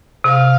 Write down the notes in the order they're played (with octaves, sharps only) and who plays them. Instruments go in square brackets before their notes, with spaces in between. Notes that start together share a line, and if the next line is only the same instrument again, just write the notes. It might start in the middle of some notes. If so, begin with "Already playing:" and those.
[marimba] C3 [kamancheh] F5